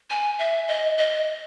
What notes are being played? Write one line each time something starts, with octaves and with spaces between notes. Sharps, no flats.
G#5
E5
D#5
D#5